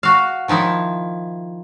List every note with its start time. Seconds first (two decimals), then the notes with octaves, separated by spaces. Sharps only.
0.03 F#4 F5
0.48 D#3 F3 D#4 E4